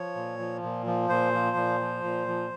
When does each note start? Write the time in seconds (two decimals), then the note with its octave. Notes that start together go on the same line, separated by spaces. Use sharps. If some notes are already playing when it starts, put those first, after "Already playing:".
Already playing: F3 C#5
0.15 A#2
0.39 F3
0.63 A#2
0.86 F3
1.09 A#2 C5
1.33 F3
1.56 A#2
1.80 F3
2.04 A#2
2.27 F3